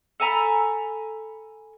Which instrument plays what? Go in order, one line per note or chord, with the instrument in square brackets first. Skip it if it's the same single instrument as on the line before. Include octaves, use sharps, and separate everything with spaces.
[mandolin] A4 G#5 A#5 B5